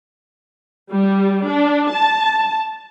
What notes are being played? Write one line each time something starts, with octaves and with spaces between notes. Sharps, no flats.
G3
D4
A5